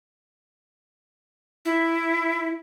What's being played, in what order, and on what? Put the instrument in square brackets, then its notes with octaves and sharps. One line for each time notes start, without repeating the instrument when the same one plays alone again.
[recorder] E4